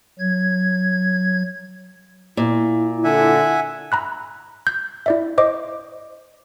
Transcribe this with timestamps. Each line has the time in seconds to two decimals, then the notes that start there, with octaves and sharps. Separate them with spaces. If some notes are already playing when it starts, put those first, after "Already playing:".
0.19 F#3 G#6
2.37 A#2 E4
3.04 D3 E5 F#5 G#5
3.92 A#5 B5 F#6
4.67 G6
5.06 E4 D5 E5
5.38 C5 D#5 D6